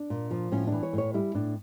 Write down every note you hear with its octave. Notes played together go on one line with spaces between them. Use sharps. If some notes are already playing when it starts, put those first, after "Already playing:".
Already playing: D4
A#2
F3
A2 C#4
E3 D4
C#5
A2
C#5
G3 E4
A2 D4